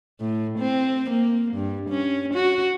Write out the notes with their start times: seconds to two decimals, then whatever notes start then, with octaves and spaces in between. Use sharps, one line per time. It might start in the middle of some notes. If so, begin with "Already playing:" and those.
0.20 A2
0.59 C4
1.10 A#3
1.54 G2
1.89 C#4
2.34 F#4